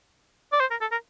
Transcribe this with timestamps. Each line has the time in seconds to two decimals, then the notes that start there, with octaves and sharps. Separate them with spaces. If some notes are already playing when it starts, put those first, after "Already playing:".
0.53 D5
0.60 C5
0.71 A#4
0.81 A4
0.92 A#4